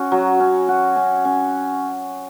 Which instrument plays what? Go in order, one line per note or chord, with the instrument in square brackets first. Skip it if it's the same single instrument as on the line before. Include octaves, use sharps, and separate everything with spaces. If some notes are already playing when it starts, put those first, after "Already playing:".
Already playing: [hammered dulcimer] C#4 F#4
F#3
C#4
F#4
C#4
C#4